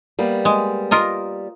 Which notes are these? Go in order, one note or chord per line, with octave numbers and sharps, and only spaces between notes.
G3 A#3 B3
G#3
F4 A#4 D#5